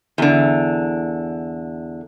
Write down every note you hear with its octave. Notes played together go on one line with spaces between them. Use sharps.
E2 D3